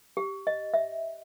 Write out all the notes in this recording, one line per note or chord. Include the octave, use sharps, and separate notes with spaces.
G4
D#5
E5